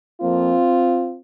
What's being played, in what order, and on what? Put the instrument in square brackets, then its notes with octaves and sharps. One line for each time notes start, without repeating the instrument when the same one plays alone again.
[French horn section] F2 F3 A#3 C4 F4